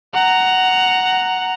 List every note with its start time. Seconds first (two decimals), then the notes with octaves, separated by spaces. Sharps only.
0.14 F#5 A#5